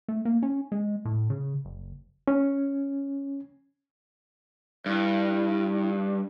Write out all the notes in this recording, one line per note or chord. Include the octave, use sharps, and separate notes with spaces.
A3
A#3
C#4
G#3
A2
C#3
F#1
C#4
G2 E4